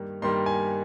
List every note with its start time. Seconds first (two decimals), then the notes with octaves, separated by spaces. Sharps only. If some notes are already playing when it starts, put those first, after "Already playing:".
Already playing: G2 D#3 G3 A#3
0.22 G2 D#3 G3 A#3 C6
0.46 G#5